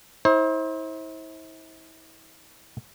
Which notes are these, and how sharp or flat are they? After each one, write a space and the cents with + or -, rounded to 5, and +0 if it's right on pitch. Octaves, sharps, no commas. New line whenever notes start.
E4 -40 C5 +30